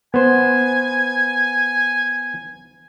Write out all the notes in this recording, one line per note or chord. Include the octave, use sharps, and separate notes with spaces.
B3 C5 G#5